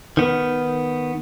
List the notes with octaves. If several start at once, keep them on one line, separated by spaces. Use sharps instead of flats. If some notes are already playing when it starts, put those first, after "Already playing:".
D#3 B3